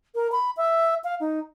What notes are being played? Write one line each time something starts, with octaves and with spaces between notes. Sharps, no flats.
A#4
B5
E5
F5
D#4